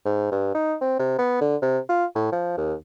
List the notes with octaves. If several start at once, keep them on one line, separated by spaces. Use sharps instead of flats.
G#2
G2
D#4
C4
C3
B3
D3
C3
F4
A2
F3
D#2